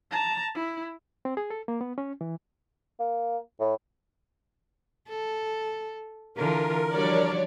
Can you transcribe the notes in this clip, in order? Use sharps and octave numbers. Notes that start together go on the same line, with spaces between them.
A5 A#5
E4
C4
G#4
A4
A#3
B3
C#4
E3
A#3
A2
A4
D3 E3 F4 A#4
F3 G3 D4 F#4 C#5 D5